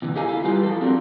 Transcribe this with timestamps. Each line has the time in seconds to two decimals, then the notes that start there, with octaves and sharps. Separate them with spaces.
0.02 E2 D3 E3
0.16 G4 A4 A#4 D#5 F5 G#5
0.28 E4 F5
0.44 G3 F4 G4 B4 F5
0.63 F3 F#4 A4
0.81 C4 D4 F#4 A#4